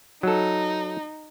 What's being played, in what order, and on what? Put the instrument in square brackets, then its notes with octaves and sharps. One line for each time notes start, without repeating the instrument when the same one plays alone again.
[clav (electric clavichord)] F#3 A4 [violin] D#4